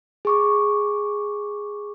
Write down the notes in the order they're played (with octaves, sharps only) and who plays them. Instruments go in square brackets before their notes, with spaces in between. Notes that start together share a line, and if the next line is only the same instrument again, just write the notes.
[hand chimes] G#4 C#6 D6